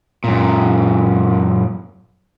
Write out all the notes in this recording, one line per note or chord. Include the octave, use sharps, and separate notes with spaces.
F#2 A#2